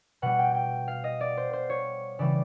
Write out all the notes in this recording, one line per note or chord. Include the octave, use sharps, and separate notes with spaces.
B2 G3 F#5
G5
G5
F5
D#5
D5
C5
C5
C#5
C#3 E3 G3 D5